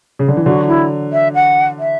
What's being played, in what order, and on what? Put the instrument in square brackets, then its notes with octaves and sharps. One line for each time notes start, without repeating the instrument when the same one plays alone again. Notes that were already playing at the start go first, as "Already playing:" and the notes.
[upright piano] C#3
D3
E3
[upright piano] D3 F#3 [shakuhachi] F#4
[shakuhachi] E4
E5
F#5
E5